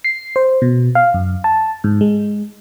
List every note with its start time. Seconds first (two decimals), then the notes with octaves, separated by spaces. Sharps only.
0.04 C7
0.36 C5
0.62 B2
0.95 F5
1.14 F#2
1.44 A5
1.84 G#2
2.01 G#3